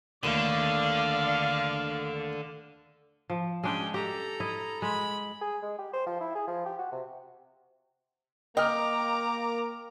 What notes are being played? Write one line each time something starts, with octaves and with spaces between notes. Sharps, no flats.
D#2 A2 D3 D5 F5
F3
G#3 C#4 D4 G5
G4 A4 A#5
E4 D#5
G#3 B5
G#4
G#3
G4
C5
F3
E4
G#4
F3
G4
F#4
C3
A#3 D#5 G5 A#5 D6 F6